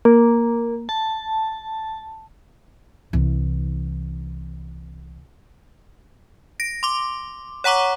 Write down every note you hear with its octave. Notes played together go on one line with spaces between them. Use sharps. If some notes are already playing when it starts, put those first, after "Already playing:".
A#3
A5
C2 E3
A#6 D7
C6 D6
C#5 F#5 A#5 C#6 D6